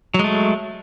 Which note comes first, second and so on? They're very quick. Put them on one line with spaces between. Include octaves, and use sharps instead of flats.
F#3 G#3 A3